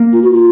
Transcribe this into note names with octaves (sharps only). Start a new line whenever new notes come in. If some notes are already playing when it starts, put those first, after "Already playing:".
Already playing: A#3
F4
F#4
F4